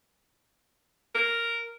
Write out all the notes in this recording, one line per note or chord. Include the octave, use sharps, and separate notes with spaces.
A#4